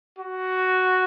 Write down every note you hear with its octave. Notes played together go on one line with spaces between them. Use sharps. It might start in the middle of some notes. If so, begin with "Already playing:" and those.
F#4